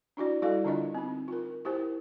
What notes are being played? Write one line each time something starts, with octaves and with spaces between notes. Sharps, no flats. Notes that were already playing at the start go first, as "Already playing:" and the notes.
D4 E4 F#4 D5
G3 E4 F#4 A4 D5 F5
D3 D4 F4 D#5
C4 D#4
F4 A#4
E4 G4 A#4 C5